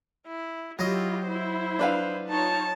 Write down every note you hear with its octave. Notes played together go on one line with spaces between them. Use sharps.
E4
F#3 E4 F4 G4 D#5
E4 C5
D4 B4 F5
D#4 F4 C#5 A5